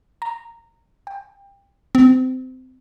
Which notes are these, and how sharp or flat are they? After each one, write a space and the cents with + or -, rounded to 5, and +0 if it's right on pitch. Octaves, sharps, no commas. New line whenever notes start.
A#5 -15
G5 +25
C4 -25